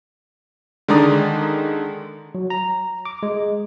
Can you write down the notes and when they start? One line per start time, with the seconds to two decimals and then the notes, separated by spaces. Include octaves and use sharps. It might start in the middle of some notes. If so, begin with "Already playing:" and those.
0.88 D3 D#3 G#3 D5 A#5 D#6
2.35 F#3
2.50 A#5
3.05 D6
3.23 G#3